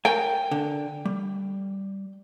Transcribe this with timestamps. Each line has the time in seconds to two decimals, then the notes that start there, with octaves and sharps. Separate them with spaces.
0.05 A#4 C#5 G5 G#5
0.51 D3
1.05 G3